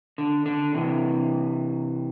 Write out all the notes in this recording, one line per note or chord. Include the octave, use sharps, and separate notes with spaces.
D3
D3
C3 E3